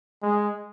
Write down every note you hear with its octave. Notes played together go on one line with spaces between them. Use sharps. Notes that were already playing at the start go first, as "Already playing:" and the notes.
G#3